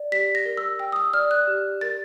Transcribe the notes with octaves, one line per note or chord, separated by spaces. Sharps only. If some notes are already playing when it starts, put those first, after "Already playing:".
Already playing: D5
G4 B6
A#6
A#4
E6
G5 E6
D#6
E6
D5 F6
F#6
G4
A#4 A6